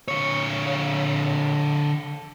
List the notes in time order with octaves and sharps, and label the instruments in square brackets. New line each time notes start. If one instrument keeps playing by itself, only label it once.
[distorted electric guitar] D3 C#5